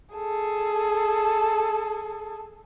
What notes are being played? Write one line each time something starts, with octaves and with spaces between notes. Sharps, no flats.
G#4 A4